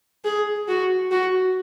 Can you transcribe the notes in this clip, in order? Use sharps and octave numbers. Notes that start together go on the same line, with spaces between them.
G#4
F#4
F#4